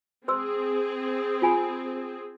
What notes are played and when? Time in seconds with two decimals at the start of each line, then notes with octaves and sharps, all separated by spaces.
0.28 C4 G#4 C5 C6 E6
1.42 F4 G#5 B5